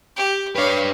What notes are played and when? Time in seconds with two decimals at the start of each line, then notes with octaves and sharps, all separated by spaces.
0.16 G4
0.56 D4 B4 C#5 F5